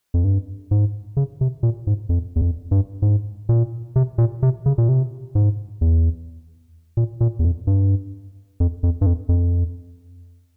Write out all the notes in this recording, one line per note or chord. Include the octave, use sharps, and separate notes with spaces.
F2
G2
G#2
C#3
C3
A#2
G#2
F2
E2
F2
G2
G#2
A#2
C3
A#2
C3
C#3
A#2
C3
G#2
E2
A#2
A#2
E2
F2
G2
F2
F2
G2
F2
F2